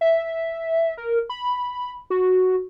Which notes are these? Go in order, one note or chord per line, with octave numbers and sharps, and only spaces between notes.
E5
A#4
B5
F#4